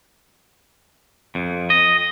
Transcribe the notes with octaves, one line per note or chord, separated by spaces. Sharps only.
F2
D#5